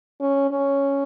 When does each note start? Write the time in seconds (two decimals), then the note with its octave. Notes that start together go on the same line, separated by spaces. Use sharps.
0.20 C#4
0.51 C#4